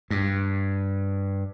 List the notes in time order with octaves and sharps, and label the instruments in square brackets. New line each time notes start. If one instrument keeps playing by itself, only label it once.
[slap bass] G2